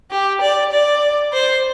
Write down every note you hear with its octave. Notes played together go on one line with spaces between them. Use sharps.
G4
D5
D5
C5